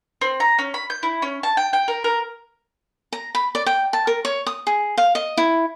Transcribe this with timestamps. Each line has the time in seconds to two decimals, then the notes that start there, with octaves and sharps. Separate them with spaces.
0.21 C4
0.40 A#5
0.59 C#4
0.74 B5
0.90 G6
1.03 E4
1.22 C#4
1.43 A5
1.57 G5
1.73 G5
1.88 A#4
2.04 A#4
3.13 A#5
3.35 B5
3.55 D5
3.66 G5
3.93 A5
4.07 A#4
4.25 C#5
4.46 D#6
4.67 G#4
4.97 F5
5.15 D#5
5.37 E4